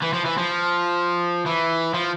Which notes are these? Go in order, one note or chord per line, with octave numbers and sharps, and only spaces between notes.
E3
F3
E3
F3
E3
F3